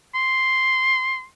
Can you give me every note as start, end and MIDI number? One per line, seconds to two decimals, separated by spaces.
0.15 1.24 84